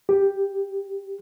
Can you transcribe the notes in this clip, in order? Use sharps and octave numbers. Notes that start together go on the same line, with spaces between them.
G4